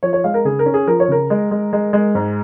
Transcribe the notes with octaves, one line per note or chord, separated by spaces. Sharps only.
F3 C#5
C#5
G#3 F5
A#4
C#3 G#4
A#4
C#4
G#4
F3 A#4
C#5
C#3 A#4
G#3
G#3
G#3
G#3
G#2